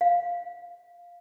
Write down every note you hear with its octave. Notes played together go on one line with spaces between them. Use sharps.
F5